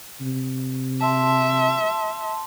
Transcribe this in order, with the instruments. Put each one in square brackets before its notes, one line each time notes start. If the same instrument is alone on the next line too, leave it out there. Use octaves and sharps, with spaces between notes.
[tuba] C3
[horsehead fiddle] E5 [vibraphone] A5 C6